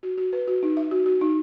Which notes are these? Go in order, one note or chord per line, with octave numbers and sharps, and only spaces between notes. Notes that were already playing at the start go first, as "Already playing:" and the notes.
F#4
F#4
B4
F#4
D#4
E5
F#4
F#4
D#4